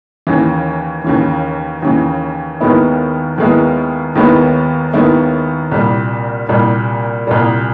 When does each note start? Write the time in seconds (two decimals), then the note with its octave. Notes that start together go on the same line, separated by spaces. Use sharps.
0.27 D#2 C#3 E3
1.04 D#2 C#3 E3
1.82 D#2 C#3 E3
2.60 D#2 D#3 G#3 B3 E4
3.38 D#2 D#3 G#3 B3 E4
4.16 D#2 D#3 G#3 B3 E4
4.94 D#2 D#3 G#3 B3 E4
5.71 C2 A#2 G3
6.49 C2 A#2 G3
7.27 C2 A#2 G3